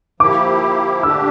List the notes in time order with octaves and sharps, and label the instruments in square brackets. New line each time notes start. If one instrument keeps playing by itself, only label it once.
[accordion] F3 A#3 E4 G4 [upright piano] D6
[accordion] D3 A3 D4 G4 [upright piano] E6